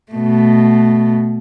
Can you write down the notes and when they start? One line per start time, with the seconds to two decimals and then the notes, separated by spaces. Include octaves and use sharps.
0.12 B2 A3